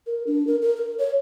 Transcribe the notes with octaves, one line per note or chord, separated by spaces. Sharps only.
A#4
D4
A#4
A#4
A#4
C#5